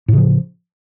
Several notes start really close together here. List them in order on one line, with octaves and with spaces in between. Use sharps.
A2 C#3 F3